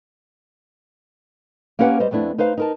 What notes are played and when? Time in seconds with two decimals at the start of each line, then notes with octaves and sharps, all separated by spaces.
1.79 A#3 C#4 G4 B4 F#5
2.00 G3 C5 D#5
2.11 F2 A3 B3 D4 E4
2.38 D#4 B4 C5 F5
2.58 D#4 A#4 A5